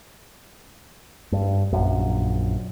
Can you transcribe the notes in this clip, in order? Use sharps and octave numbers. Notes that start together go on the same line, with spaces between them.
G2
A#1 F#2